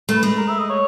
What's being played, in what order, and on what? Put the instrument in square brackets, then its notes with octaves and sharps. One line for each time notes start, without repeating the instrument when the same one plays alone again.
[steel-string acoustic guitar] A3
[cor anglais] B4
[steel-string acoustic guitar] G#3
[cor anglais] A#4
E5
D#5
C#5